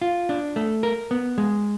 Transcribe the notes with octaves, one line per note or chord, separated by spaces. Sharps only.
F4
D4
A3
A#4
B3
G#3